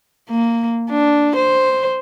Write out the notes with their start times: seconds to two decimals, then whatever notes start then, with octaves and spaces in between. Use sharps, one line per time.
0.29 A#3
0.90 D4
1.36 C5